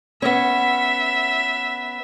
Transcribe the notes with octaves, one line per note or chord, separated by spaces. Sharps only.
B3 C#4 E5